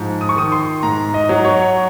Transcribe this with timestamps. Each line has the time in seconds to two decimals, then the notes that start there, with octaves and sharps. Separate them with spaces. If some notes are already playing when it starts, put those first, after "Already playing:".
Already playing: G#2 F3
0.21 D#6
0.29 C#6
0.36 D#3 D#6
0.52 C6
0.83 G#2 A#5
1.14 D#5
1.29 F#3
1.45 C#5